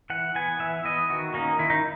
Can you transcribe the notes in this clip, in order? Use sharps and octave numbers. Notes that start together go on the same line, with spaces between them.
E3 F#5
B3 G#5
E3 E5
B3 D#5
D#3 F#4
A#3 C#4 D#4
D#3 E4
D#4